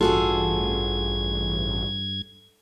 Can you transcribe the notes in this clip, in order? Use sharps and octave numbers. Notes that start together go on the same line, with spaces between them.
A1 G2 F4 F#4 G#4 A4 G#6